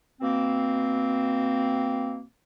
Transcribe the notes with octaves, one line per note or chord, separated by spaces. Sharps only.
B2 A#3 C4